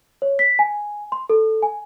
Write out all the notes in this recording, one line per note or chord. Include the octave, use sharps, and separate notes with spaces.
C#5
B6
G#5
C6
A4
G#5